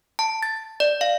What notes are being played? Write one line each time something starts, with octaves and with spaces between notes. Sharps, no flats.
A5
A6
D5
F5